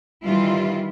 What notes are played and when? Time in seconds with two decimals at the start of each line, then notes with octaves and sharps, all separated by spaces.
0.24 D#3 E3 G3 E4 F4